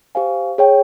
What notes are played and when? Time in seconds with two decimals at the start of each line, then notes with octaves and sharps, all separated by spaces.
0.15 G4 C5 F5 G#5
0.58 G#4 C#5 G5